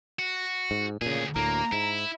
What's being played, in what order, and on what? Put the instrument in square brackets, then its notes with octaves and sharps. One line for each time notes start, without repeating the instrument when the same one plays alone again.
[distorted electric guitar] F#4
[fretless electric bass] G#2
[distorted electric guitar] D2 G#4 [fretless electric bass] A#2 C#3
[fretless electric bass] D2 A2 [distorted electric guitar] A#3 [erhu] A#5
[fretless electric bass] G#2 [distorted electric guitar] E4